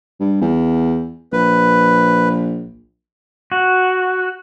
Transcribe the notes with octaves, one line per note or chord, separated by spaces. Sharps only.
G2
E2
A#1 B4
F#4